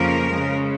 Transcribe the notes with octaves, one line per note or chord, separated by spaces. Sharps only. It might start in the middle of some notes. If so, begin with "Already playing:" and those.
Already playing: F2 C#3 F3 A#3 C#4 A#4
C#3 G#3 C#4